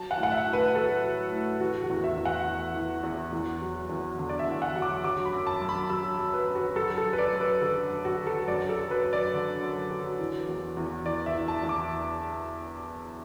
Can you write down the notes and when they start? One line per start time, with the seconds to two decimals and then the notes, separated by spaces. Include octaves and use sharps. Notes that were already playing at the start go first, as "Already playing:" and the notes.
Already playing: F#3 A5
0.11 F#5
0.17 A2
0.23 F#5
0.31 E5
0.46 A2
0.53 B4
0.75 F#3 A4
1.04 F#3
1.32 A2
1.60 E3 F#4
1.83 F#4
1.90 E2
2.04 E5
2.18 E2
2.25 F#5
2.46 E3
2.75 E3
3.03 E2
3.32 E2
3.61 F#3
3.89 E2
4.18 D3
4.29 D5
4.39 E5
4.47 E2
4.62 F#5
4.76 F#3
4.82 D6
5.04 F#3 D6
5.25 B5
5.33 F#2
5.47 A5
5.61 F#2
5.69 B5
5.90 F#3 E6
6.18 F#3
6.34 B4
6.47 F#2
6.55 F#4
6.76 F#2 A4
6.98 A4
7.05 F#3
7.13 B4
7.18 D5
7.33 F#2
7.40 B4
7.61 D3 A4
7.90 F#2
8.05 F#4
8.19 F#3
8.27 A4
8.47 F#2 D5
8.69 A4
8.76 F#3
8.91 B4
9.05 F#2
9.13 D5
9.33 D3
9.62 F#2
9.90 F#3
10.19 E3
10.48 E2
10.77 E2
11.05 E3 D5
11.26 E5
11.34 E3
11.48 A5
11.63 E2
11.69 D6